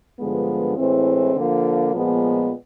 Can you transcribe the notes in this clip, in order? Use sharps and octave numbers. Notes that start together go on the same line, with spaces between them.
G2 D3 F3 G#3 B3
A2 E3 G#3 C4
D3 F3 A#3
A#2 F3 G#3 B3